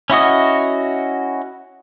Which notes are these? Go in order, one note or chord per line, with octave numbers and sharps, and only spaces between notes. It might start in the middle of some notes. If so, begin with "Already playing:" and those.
C#4 E4 F#4 D#5